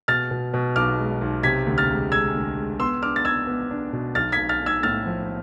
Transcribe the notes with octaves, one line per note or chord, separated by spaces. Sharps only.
B2 F6 A6
B2
B2
B1 D6 F6
G#3
B1
C3 G#6 B6
D2
F6 A6
G#3
G#3 E6 G#6
D2
G#3
B3 C6 E6
D4 D6 F6
A6
B3 E6 G#6
B3
D4
B2
B1 F6 A6
G#6 B6
B1
F6 A6
B1
E6 G#6
A2 F6 A6
F3